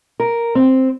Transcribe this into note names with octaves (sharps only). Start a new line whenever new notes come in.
A#4
C4